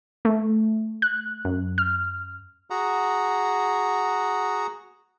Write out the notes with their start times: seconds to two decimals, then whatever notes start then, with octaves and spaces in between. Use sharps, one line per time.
0.25 A3
1.02 F#6
1.45 F#2
1.78 F6
2.70 F#4 G#4 F#5 A#5